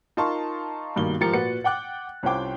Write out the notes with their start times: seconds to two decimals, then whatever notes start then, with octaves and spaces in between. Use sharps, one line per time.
0.17 D#4 F4 A#4 A5 C6 C#6
0.96 G2 B2 D#3 A#3 G7
1.20 G#2 F3 G4 A#4 A6 C#7
1.33 A#2 F#4 B4 C#7
1.64 F#5 G5 D6 F#6
2.23 C2 C#4 F4 C5 G5 D6